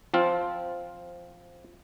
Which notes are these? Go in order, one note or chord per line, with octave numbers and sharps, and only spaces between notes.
F3 C4 F4